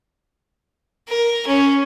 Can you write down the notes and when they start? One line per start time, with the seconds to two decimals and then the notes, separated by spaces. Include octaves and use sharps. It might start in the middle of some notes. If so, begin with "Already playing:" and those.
1.09 A#4
1.47 C#4